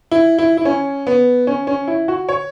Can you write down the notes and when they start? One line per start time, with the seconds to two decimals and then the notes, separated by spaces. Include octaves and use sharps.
0.11 E4
0.39 E4
0.57 E4
0.65 C#4
1.07 B3
1.47 C#4
1.67 C#4
1.88 E4
2.08 F#4
2.29 C#5